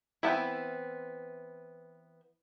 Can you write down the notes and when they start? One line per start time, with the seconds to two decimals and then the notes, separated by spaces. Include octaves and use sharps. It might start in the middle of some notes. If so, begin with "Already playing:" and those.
0.23 E3 B3 C4 E4